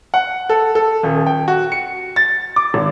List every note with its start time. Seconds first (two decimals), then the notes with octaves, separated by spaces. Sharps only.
0.14 F#5
0.49 A4
0.75 A4
1.03 D#1
1.26 G5
1.48 F#4
1.72 C#7
2.16 A6
2.56 D6
2.74 G#1